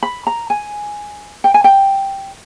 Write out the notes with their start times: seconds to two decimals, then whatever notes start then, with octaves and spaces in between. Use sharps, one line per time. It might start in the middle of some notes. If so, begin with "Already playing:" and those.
0.03 B5
0.27 A#5
0.50 G#5
1.44 G5
1.54 G#5
1.64 G5